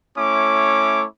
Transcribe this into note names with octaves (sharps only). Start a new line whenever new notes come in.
A3 C#4 E4 C#5 D6